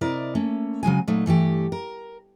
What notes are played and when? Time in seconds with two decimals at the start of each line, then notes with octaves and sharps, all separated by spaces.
0.01 C3 E4 A#4 D5 D#5
0.35 A3 A#3 C#4
0.83 C#3 F#3 G#3 G#5
1.08 A#2 F#3 A3 D#4
1.26 G2 E3 A3 G4
1.72 A#4